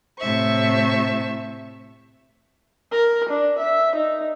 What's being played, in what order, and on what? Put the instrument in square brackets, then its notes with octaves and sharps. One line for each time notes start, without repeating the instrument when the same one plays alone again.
[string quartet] A2 C3 C5 E5 C#6
[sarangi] A#4
D4
E5
D#4